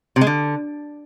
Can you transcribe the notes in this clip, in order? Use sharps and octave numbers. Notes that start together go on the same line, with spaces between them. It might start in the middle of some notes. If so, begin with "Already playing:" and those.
C3
G#3
D3